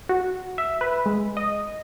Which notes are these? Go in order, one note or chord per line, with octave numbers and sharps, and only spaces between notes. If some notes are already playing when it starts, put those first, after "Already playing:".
F#4
E5
B4
G#3
D#5